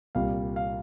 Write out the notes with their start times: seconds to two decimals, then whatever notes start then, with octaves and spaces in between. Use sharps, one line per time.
0.15 C2 A#2 G3 F5
0.56 F5